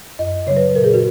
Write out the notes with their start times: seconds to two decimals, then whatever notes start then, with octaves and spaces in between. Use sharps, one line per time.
0.19 F#2 D#5
0.47 C#3 F#3 C#5
0.57 B4
0.75 A#2 A#4
0.84 G#4
0.94 F#4